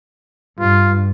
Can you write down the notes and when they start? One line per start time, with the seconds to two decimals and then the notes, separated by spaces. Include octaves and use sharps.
0.59 G2 F4